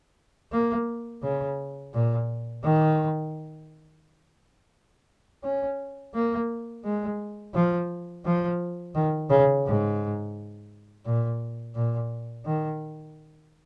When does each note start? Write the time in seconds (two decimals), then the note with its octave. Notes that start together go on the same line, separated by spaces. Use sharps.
0.52 A#3
1.23 C#3
1.93 A#2
2.63 D#3
5.44 C#4
6.14 A#3
6.84 G#3
7.54 F3
8.25 F3
8.95 D#3
9.30 C#3
9.65 G#2
11.05 A#2
11.75 A#2
12.45 D#3